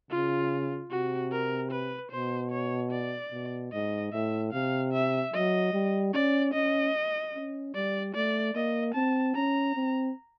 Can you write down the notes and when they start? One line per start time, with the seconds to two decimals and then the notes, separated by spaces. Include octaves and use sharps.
0.10 C#3 F4
0.91 C3 F#4
1.31 A#4
1.71 B4
2.12 B2 C5
2.51 C#5
2.92 D5
3.32 B2
3.72 G#2 D#5
4.13 A2 E5
4.53 C3 F5
4.93 E5
5.34 F#3 D#5
5.73 G3
6.14 C#4 D5
6.54 C#4 D#5
7.34 C#4
7.75 G3 D5
8.15 A3 D5
8.55 A#3 D#5
8.95 C4 A5
9.35 C#4 A#5
9.76 C4